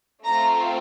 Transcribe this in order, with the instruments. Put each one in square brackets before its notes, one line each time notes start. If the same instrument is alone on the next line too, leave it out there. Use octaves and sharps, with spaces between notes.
[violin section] A3 C4 F4 A#5